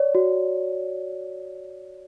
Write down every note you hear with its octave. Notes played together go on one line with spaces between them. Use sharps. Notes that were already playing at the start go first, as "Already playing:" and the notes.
Already playing: C#5 D5
F#4